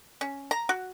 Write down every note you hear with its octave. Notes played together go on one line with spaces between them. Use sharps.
C#4
A#5
F#4